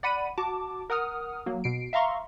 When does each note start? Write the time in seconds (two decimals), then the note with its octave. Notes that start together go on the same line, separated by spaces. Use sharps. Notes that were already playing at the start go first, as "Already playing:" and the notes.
0.03 D5 F#5 B5 D#7
0.38 F#4 A5 D6
0.90 A#4 F#5 D#6 F6
1.46 F#3 A#3
1.64 B2 C7 D7
1.93 E5 F5 A#5 C6 C#6